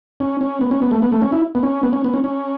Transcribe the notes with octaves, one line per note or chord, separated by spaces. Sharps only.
C#4
C#4
B3
C#4
B3
A3
B3
A3
C#4
E4
B3
C#4
B3
C#4
B3
C#4
C#4